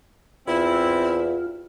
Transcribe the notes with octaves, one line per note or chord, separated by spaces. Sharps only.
E2 C4 E4 F4